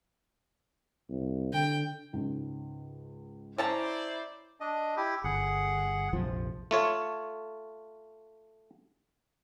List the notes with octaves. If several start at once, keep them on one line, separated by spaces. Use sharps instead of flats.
C2
D3 G5
C#2 G#2
C#4 E4 C5 D5 A5 A#5
D4 D#5
E4 G4
G1 G#4 F#5
F1 A#1 F3
A3 F4 C#5